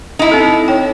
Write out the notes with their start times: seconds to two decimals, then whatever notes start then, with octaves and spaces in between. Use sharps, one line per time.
0.19 D#4 E4
0.31 C4 A4
0.68 C#5 G5